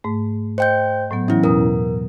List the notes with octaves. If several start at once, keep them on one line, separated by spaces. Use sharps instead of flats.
G#2 A3
C5 D#5 G5 G6
A2 F#3 B3
E3 F#3 C#4 E4
E2 B2 A#4 D#6